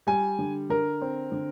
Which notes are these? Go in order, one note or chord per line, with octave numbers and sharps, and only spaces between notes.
G3 G#5
D3
D3 A#4
C4
D3